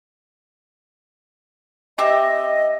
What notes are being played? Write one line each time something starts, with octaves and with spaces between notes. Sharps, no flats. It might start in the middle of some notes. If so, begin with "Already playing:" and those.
C4 G4 D#5 E5